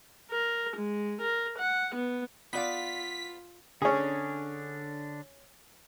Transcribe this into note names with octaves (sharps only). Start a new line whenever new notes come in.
A#4
G#3
A#4
F#5
B3
B3 F4 D5 F5 B6
D3 C#4 D4 G#4